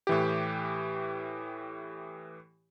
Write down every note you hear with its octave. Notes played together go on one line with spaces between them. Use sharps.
A2 E3 G4